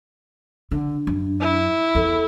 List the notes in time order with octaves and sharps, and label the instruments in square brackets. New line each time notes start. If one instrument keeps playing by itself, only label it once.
[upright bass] D3 [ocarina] D4
[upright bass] F#2
[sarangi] E4
[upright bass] E2 [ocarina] A4